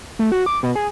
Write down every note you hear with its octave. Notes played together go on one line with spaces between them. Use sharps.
A3
F#4
D6
B2
G#4